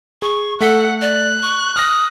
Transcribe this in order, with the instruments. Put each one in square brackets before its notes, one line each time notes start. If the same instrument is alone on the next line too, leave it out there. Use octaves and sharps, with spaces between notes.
[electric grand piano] G#4 [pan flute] C#6
[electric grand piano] A3 B6 [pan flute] A4 [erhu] F#5
[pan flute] D5 [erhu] F#6
[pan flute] C#6
[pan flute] D#6 [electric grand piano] F6 A#6